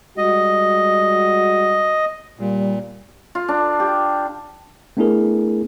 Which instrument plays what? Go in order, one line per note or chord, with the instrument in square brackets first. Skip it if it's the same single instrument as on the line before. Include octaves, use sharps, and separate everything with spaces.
[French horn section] G3 G#3 F#4 [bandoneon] D#5
[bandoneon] A#2 [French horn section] G3
[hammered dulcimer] F4
D4
G4
[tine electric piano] A3 B3 D4 E4 G#4 A#4